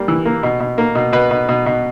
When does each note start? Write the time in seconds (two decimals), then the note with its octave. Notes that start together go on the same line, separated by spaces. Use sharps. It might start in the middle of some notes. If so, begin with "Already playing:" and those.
Already playing: G3 A#3
0.08 E3
0.25 A#3
0.43 B2
0.60 B2
0.78 A#3
0.95 B2
1.13 B2 B4
1.31 B2
1.49 B2
1.66 B2